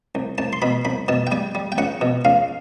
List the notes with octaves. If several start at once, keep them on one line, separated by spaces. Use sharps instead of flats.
C2
C2 A5
C6
B2 B5
C2 B5
B2 A5
G5
G3 G#5
G3
G5
C#2 F#5
B2
C#2 F5